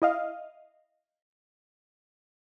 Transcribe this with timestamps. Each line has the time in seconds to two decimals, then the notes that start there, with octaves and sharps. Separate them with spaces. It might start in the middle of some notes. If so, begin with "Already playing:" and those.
0.02 E4 D#5 F5